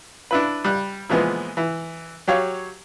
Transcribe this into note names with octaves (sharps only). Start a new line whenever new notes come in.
D4 E4 B4
G3 F#6
A#2 E3 F3 G#3 B3
E3
F#3 G4 C#5 F5